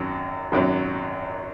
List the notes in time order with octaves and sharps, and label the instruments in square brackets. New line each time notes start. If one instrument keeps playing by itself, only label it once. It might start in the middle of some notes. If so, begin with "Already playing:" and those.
Already playing: [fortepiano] G#1 F#2 F#3
G#1 F#2 F#3